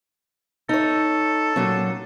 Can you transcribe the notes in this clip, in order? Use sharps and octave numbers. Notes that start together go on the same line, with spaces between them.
D#4 A4 C#5
A#2 F#3 C#4